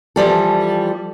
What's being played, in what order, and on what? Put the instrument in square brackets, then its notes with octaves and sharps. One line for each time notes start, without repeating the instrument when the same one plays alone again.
[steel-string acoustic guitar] E3 F3 G3 A4